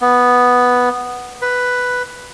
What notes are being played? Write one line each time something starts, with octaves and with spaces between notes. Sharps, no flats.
B3
B4